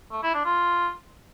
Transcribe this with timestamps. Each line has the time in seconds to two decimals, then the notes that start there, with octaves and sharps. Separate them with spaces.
0.12 A3
0.23 E4
0.34 D4
0.45 F4